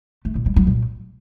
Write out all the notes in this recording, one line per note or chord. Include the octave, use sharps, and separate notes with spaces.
A3
A#2
G3
F#3
A#2